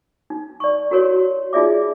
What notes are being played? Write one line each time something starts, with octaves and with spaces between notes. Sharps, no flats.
D#4
D5 C#6
E4 F#4 G4 A#4 C#5
D#4 F4 G#4 D5 E5 D6